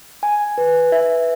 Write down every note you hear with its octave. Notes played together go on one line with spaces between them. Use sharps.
G#5
B4
E5